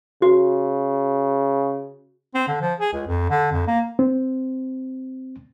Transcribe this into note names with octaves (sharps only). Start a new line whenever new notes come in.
C#3 F#4
C4
D3
F3
G#4
C#2
F2
D3
F2
A#3
C4